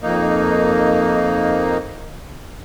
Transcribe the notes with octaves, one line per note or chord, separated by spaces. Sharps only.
F2 A#3 D#4